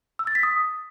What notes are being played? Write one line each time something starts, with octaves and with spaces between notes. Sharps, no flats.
E6
A6
B6
D#6